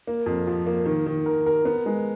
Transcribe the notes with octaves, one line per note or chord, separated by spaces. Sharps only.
A#3
F2
F3
A#3
D#3
D#3
A#4
A#4
B3
G#3